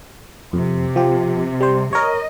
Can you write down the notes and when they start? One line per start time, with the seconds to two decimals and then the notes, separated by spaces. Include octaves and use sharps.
0.53 F2 C3
0.96 F3 G4
1.61 G3 C5
1.93 A#4 C#5 D#5